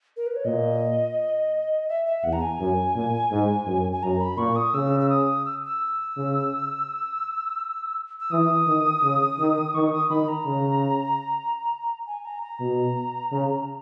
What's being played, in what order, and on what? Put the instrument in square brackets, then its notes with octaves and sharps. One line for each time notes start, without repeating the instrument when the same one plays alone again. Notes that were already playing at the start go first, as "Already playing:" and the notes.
[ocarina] A#4
B4
C#5
[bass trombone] A#2 [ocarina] D#5
[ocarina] E5
E5
[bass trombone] E2 [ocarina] F#5
[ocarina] A#5
G#5
[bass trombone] F#2
A#2
G#2
F#2
[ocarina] G#5
[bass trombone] F#2 [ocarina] A#5
[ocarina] B5
[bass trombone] A#2 [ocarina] C#6
[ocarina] D#6
[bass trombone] C#3 [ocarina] E6
[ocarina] E6
D#6
E6
E6
[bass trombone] C#3
[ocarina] E6
[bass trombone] E3 [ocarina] D#6
[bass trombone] D#3
C#3
D#3
[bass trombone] D#3 [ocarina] C#6
[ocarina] D#6
[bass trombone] D#3 [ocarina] B5
[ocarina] A#5
[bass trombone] C#3
[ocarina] G#5
A#5
A#5
[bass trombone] B2
C#3